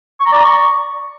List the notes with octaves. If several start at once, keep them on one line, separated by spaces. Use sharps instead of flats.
C#6
A#5
D5
A#5
C#6